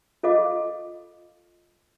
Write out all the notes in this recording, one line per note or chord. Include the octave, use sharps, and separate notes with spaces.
F4 A4 D#5 F5 D6